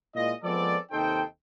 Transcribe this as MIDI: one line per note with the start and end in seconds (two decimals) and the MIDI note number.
0.14 0.32 46
0.14 0.32 56
0.14 0.32 64
0.14 0.32 65
0.14 0.32 75
0.44 0.78 53
0.44 0.78 56
0.44 0.78 59
0.44 0.78 60
0.44 0.78 69
0.44 0.78 74
0.91 1.22 39
0.91 1.22 48
0.91 1.22 63
0.91 1.22 69
0.91 1.22 72
0.91 1.22 79